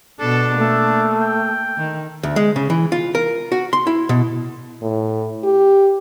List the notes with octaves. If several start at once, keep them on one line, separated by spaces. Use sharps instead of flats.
B2 D4 A4
A3 A#3
G5
D#3
D2
G#3
C#3
E3
F4
A#4
F#4
C6
E4
B2
A2
G4